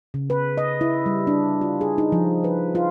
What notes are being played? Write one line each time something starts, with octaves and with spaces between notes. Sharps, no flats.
C#3
B4
D#5
E4
G3
D4
F4
G#4
D#4
F3
B4
F4